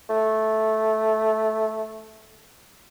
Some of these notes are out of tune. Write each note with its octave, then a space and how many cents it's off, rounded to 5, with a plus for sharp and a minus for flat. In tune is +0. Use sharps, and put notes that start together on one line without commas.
A3 -10